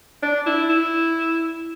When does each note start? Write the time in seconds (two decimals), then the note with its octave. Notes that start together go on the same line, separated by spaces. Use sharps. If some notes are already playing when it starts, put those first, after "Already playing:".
0.22 D4
0.46 E4
0.69 E4